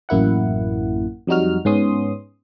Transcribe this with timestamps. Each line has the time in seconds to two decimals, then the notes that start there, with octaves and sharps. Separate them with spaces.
0.09 A1 F#2 A#3 E4 F#5
1.27 F2 F#3 G3 D#4 F#4 F6
1.65 G#2 B3 C#4 C6 D#6